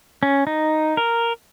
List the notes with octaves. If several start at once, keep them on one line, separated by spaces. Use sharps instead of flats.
C#4
D#4
A#4